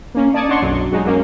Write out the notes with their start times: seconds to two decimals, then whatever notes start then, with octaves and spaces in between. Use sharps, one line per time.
0.15 A#3 C#4
0.34 D5 A5 D6 D#6 G#6 C#7
0.49 D4 C#5 D#5 F#5 C6 C#6
0.62 B1 F#2 F#3
0.92 F#3 G#3 D#4
1.05 F#3 A#3 C#4